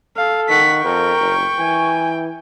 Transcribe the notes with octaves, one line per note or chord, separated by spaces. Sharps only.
A4 F5
D#3 F#5 C#6 B6
F2 A#4 G5
F#1
E3 G#5